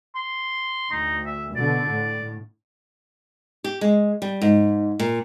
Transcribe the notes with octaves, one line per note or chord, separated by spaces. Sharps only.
C6
D2 D#4
E5
B2 D3 D5
A2
G4
G#3
G3
G#2
A#2